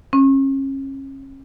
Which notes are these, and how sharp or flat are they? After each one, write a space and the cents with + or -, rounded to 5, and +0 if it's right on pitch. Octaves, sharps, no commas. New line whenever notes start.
C#4 -35